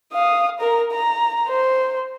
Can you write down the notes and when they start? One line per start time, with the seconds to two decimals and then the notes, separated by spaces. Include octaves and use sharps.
0.13 F5 D#6
0.60 A#4 A#5
0.91 A#5
1.48 C5